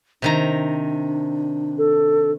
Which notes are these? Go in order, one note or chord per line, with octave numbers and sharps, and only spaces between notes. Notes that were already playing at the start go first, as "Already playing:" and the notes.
C3 D#3 D4 A#5
A4